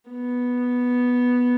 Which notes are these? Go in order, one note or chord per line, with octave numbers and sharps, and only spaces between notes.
B3